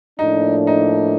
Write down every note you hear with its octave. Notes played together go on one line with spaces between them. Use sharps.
A2 F3 A#3 D4 D#4
D#4